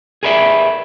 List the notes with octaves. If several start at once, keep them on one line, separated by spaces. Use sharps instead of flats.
G#4 A#4 B4 D5 E5